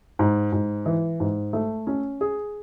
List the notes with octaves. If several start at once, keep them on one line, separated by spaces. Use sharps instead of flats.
G#2
G#2
E3
G#2
A3
C#4
G#4